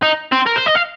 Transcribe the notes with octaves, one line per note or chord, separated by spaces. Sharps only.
D#4
C4
A#4
C5
D#5
F5